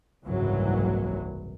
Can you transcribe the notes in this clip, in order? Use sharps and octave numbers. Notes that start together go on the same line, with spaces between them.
F#1 C2 G#2 E3 F#3